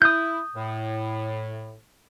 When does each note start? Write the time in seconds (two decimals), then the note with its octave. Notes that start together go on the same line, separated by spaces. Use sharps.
0.02 E4 D#6 G6
0.56 A2